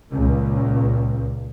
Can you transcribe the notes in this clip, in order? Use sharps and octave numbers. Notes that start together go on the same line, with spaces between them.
C#2 A#2